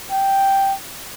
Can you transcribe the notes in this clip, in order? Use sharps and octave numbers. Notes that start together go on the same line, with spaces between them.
G5